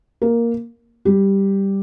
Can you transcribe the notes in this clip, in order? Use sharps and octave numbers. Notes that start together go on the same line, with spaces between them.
A#3 A#4
G3 G4